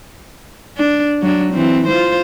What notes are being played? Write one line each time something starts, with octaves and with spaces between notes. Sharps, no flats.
D4
F#3 D4
E3 C4
F4 C5